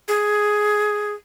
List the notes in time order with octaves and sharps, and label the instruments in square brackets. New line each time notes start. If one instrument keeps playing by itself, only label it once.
[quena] G#4